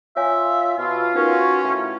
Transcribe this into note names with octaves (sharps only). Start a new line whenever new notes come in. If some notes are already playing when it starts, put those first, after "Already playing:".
F4 C#5 E5 F5 G#5
B2 F4
C#4 D#4 F#4 A#4 B4
A2